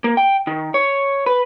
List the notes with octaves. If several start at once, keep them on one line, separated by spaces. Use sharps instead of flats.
A#3
G5
D#3
C#5
B4